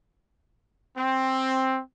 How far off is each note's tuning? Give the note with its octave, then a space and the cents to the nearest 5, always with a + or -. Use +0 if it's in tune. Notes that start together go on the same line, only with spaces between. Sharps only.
C4 +10